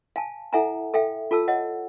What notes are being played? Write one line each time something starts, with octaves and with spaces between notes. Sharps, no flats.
F5 G#5 A5
E4 A4 E5 F#5 G#5 A#5
A4 E5 F5 G5
F4 A4 A5 E6
C#5 D#5 F#5